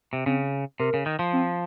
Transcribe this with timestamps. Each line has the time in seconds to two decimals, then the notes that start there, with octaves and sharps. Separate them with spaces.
0.13 C3
0.26 C#3 C4
0.80 C3 A#4
0.94 C#3
1.06 D#3
1.19 F3
1.33 C4